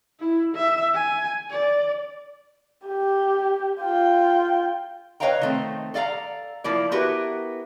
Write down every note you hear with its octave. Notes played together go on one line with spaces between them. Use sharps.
E4
E5
G#5
D5
G4
F4 G5
B4 C#5 D#5 F5 G5 A#5
D#3 A3 C4
A4 D5 F5 F#5 A#5
F3 A#3 E4 D5
B3 E4 F#4 G4 A#4 B4